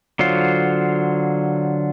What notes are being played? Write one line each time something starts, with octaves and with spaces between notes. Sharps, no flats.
D3 F#3 F4 C5